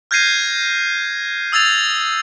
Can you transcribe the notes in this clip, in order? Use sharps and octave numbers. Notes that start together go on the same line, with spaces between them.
F6 G6 G#6 A#6 C7 D#7
D#6 E6 G#6 A6 F7